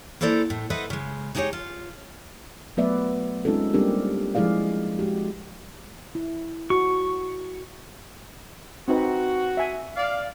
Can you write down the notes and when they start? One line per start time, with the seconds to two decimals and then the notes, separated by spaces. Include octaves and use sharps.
0.21 A#3 E4 A4 C5 D5 A#5
0.50 A2
0.70 A4 B4 C5 D#5 E5 F#5
0.90 C#3 G#3
1.35 G#3 D#4 E4 G4 G#4 C#5
1.53 F4
2.77 F#3 A3 B3 B4 D5 E5
3.45 G#3 C4 C#4 D#4 F4 A4
3.73 G3 A#3 C4 D4 G4 A#4
4.35 F3 G#3 E4 G#4 D5 F5
4.99 G#3 F#4 G4
6.15 E4
6.70 F#4 C#6
8.88 C4 D#4 F#4 B4
9.57 E5 G#5
9.96 D5 F5